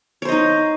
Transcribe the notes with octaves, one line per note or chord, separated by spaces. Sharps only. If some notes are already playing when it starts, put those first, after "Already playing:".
D#4 C5 C#5 D#5